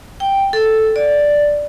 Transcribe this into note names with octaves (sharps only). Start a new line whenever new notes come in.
G5
A4
D5